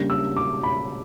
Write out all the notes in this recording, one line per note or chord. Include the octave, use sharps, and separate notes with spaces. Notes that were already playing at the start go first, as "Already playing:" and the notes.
Already playing: C#3 G3 A#3 D4
E6
D6
B5